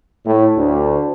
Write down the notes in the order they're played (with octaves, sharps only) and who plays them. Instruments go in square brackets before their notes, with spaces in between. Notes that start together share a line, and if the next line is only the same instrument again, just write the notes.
[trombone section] A2
D2